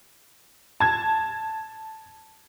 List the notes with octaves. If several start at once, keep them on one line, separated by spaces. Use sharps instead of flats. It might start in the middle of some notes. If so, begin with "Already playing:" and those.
A5 G#6